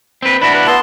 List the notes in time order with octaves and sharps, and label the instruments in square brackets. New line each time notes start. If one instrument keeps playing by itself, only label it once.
[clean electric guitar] C4 B4
[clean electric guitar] D4 E4 F#4 [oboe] B5
[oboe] B4
[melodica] B3 A5 C6 [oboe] E4